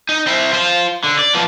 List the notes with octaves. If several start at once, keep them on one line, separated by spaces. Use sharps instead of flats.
D#4
C4 E4
F4 C5
D3
D5
F3 B3